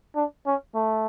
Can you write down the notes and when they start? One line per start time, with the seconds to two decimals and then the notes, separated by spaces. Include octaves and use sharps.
0.16 D4
0.46 C#4
0.75 A3